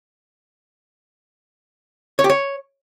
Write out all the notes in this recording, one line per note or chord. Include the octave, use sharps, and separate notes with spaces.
C#5
G4
C#5